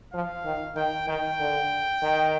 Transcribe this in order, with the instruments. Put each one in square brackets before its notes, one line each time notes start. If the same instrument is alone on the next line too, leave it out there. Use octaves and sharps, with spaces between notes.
[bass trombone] F3 [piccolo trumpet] F5
[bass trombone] D#3
[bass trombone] D#3 [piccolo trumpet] G5
[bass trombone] D#3 [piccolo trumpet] G5
[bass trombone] D3
D#3